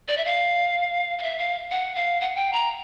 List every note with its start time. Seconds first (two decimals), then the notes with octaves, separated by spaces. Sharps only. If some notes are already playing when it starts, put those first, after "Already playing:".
0.08 D5
0.17 E5
0.25 F5
1.19 F5
1.23 E5
1.38 F5
1.71 F#5
1.95 F5
2.21 F#5
2.36 G5
2.53 A#5